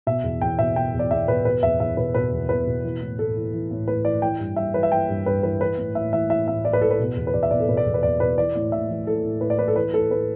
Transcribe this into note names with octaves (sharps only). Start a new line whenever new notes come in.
B2 E5
E2
E2 G5
B2 E5
B2 G5
E2
D5
E2 E5
B2 B4
B2 B4
E2 E5
E2 E5
B2 B4
B2 B4
E2
E2 B4
B2
E3
A2
A2 A4
E3
E3
A2
A2 B4
E3 D5
E3 G5
G2
G2 E5
E3 B4
E5
E3 G5
G2
G2 B4
E3 B4
E3 B4
A2
A2 E5
E3 E5
E3 E5
A2 E5
A2 D5
B4
E3 A4
B4
B2
E2
B4
E2 D5
E5
B2 D5
A4
B2 B4
D5
E2
B4
E2 D5
B2 B4
E3 D5
A2
A2 E5
E3
E3 A4
A2
A2 B4
D5
E3 B4
A4
E3 B4
A2 A4
A2 B4